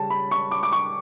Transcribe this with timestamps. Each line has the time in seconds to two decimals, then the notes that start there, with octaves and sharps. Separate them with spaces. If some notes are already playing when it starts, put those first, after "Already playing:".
Already playing: C#3 G3 C#4 A5
0.10 B5
0.31 C#6
0.51 D6
0.63 D6
0.72 C#6